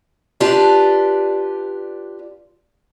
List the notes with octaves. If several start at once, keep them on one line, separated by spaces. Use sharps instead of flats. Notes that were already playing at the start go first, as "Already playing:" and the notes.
D4 F4 G4 B4 D5